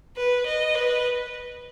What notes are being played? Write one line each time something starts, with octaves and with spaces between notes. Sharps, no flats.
B4
D#5
B4